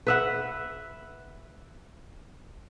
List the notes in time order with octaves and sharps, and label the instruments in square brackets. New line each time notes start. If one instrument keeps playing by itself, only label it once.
[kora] B4 E5 F#5